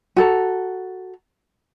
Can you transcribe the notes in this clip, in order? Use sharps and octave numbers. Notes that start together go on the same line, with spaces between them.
F#4 A4 A#5